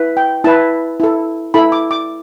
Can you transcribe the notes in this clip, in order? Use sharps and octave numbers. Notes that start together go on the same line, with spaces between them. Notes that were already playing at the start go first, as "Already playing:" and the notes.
Already playing: E4 B4
G5
E4 B4 A5
E4 A4
E4 A4 B5
D6
D6